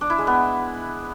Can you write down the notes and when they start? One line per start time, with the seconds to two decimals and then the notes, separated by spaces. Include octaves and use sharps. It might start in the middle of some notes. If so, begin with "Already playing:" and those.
0.01 D4
0.10 E4
0.18 G#3
0.27 B3